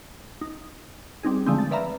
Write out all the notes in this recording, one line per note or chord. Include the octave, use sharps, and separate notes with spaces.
D#4
G3 C4 D#4 G#4
D3 F3 G#3 A3 C4
A6
B4 D5 E5 F5 A#5 B5